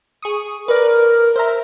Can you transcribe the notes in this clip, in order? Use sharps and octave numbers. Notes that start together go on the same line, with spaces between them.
G#4 C#6 D#6
A#4 B4 D5
C5 E5 A#5